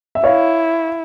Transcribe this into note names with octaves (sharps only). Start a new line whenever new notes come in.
E5
E4 C#5 F5